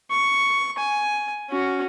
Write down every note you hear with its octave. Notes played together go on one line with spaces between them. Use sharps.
C#6
G#5
C#4 F#4